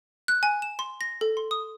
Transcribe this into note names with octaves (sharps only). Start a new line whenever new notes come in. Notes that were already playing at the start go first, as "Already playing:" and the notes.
F#6
G#5
E7
C6
A#6
A4
C6
D#6